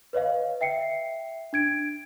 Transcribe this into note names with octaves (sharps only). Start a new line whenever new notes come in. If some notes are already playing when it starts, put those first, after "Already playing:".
B4 C#5 D#5 F5
E5 G5 C7 C#7
D4 G#6 D7